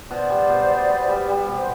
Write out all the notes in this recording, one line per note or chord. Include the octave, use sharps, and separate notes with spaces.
B2 C5 D5
G3
B2
B3
B3
G3
G3
B2
C5